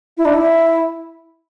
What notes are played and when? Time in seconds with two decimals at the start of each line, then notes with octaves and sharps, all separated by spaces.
0.18 E4
0.25 D4
0.34 E4